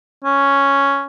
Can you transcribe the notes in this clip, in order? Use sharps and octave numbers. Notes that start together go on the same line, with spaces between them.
C#4